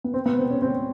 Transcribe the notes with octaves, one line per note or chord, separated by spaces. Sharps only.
B3
C4
B3
C4
C#4
C4